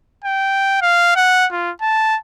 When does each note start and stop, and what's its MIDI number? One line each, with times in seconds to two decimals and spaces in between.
0.25 0.79 79
0.82 1.16 77
1.16 1.46 78
1.52 1.72 65
1.82 2.17 81